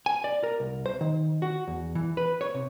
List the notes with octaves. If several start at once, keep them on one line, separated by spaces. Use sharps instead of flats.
G#5
D5
A#4
C2
C5
D#3
F#4
E2
E3
B4
C#5
C3